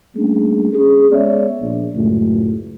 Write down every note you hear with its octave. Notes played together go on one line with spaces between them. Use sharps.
G3 A3 A#3 C#4 D4 G#4
C#4 G#4
G#3 B3 G#4 C#5 D5 E5
A#1
C#2 F#2 A2